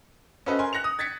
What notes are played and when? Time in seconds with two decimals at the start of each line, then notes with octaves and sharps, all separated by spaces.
0.46 C#4 F#4 A4 B4 C5 D#5
0.59 A#4 G#5 C6
0.73 F#6 A#6 C#7 F7
0.84 D#6
0.99 G#6 A6 B6 C#7